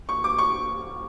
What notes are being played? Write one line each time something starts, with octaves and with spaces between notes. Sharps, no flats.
C#6
D6
C#6